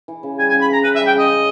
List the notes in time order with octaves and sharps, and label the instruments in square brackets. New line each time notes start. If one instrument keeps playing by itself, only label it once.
[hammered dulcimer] E3
C#3
[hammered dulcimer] G3 [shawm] G#5
[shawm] G#5
[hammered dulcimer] C#3
[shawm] B5
[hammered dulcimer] E3 [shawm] A#5
[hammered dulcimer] C#3 [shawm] B4
[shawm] E5
[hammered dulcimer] G3
[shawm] G5
[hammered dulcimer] C#3 [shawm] D#5
[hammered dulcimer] C#4